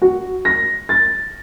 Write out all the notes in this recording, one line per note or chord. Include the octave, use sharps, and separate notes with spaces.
F#4
A#6
A6